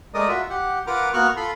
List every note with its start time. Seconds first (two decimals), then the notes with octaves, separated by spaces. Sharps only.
0.14 G#3 A3 A#4 D5 D#5 D#6
0.29 F4 F#4 E5
0.50 G4 F#5
0.87 F4 A#4 B4 F#5 A#5 D6
1.13 A#3 B3 F#4 C#6 F6 F#6
1.37 F4 A4 B5 C6